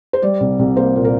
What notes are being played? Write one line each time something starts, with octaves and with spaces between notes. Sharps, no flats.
C5
G3 D5
C2
C2
A#3 C5
A#2
A#4